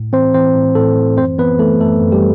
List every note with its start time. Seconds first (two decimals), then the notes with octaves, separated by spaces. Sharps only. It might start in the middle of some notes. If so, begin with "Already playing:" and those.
Already playing: A2
0.13 E3 C4 C5
0.34 E3 C4 C5
0.54 A2
0.75 A2 A3 A4
0.97 E3
1.17 F#2 C4 C5
1.38 E3 B3 B4
1.59 E3 A3 A4
1.81 F#2 A3 A4
2.02 F#2
2.12 G3 G4